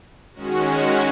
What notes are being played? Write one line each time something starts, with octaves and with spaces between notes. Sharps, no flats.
D#3 G#3 C#4 F#4